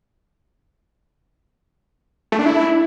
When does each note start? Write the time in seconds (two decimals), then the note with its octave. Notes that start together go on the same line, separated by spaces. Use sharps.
2.32 A3
2.39 D4
2.46 E4